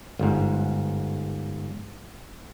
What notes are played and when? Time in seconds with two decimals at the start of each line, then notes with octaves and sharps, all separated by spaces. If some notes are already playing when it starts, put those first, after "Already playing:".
0.19 G1 G#2